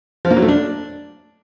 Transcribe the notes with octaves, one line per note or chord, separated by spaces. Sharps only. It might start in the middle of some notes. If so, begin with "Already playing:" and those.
F3
A#3
F#3
A3
D4